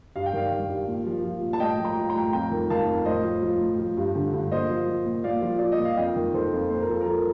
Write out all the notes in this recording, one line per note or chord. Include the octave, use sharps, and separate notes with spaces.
G2 F5
G5
D#3 D5 F5
D#3
G2
A#2
F3
F3
A#2
A5
A2 D#5 G5
F3
G5 A#5
F3
G5 A#5
A2
F2 G5 A#5
D#3
D#3 F5 A5
F2
A2 C5 D#5
F3
F3
A2
F3
G2
D3
G2
A#2 C5 D#5
F3
F3
A#2
A#2 D5 F5
F3
F3 D5
D#5
A#2
F5
F2 D#5 G5
D#3
D#3 A4 C5
F2
A#2 C5
A#4
F3 A4
F3 A#4